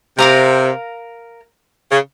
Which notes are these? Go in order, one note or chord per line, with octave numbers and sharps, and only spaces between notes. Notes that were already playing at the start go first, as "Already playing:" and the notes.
C3 A#4 F5 A#5
C#3